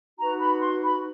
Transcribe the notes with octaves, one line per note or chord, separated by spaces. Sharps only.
D#4 F#4 B4 A#5
B5
C6
B5